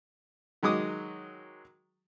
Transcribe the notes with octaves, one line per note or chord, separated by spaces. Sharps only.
D#3 F#3 G#3 D6 D#6